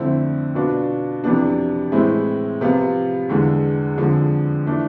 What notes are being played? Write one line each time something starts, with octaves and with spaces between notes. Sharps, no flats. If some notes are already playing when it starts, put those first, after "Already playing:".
Already playing: F2 D3 A3 C4 E4
B2 B3 D4 F4
F2 C3 E3 B3 D4
A2 E3 G#3 C4 E4
C3 F3 B3 F4
E2 D3 G#3
F2 D3 F3 G#3
E3 A3 D4